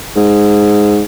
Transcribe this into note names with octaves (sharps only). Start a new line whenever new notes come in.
G#2